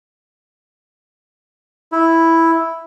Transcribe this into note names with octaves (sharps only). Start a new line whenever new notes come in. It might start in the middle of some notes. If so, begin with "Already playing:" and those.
E4